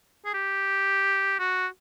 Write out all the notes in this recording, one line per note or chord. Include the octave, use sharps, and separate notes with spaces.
G#4
G4
F#4